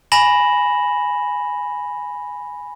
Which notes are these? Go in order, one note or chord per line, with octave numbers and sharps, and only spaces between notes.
G#5 B5 A#6 E7 F#7